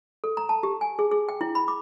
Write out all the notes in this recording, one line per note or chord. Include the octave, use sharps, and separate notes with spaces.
A4
A#5
A5
G4
G#5
G#4
G#4
G5
E4
B5
D6